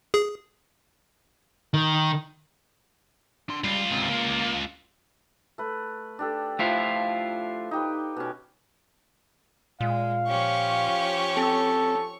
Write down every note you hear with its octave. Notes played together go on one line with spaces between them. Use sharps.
G#4
D#3
D4 C6
C#2 G3 F4
G#2 C3
A#3
A3 B4
D4 G4 A4
F3 A3 E4 F4
D#4 G4 B4
B2 C#4
A#2 G#3 F5
F3 C#4 G4 C#5 C#6
C4 A4